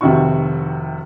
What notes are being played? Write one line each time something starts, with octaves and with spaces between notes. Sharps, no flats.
F1 C3 D#3 E4 F#4 C#6